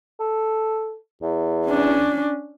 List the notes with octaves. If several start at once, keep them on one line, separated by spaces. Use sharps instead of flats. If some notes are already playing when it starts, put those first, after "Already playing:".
A4
E2
C#4 D4